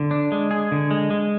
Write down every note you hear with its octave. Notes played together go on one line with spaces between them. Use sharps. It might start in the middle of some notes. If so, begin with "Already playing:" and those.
Already playing: D3
D4
G#3
G#4
D3
G#3
G#3